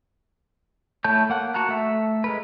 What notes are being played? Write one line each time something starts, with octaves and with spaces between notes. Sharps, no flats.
A3 E4 C#5 A5 G6
A#3 F#5 F#6
F#4 A5 A#5 F#6
A3 E5
G#3 A#4 B4